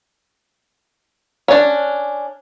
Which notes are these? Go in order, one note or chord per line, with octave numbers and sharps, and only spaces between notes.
C#4 D4